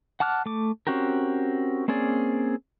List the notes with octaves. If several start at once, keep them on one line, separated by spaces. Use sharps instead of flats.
F#5 A5 D6 F6 F#6
A3 D6
C4 C#4 F#4 G4 A#4
A#3 C4 C#4 G#4 D5